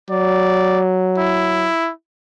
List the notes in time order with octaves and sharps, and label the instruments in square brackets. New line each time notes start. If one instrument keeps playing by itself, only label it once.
[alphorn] F#3 [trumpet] D5
[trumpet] E4